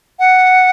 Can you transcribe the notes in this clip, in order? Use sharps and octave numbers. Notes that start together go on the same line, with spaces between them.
F#5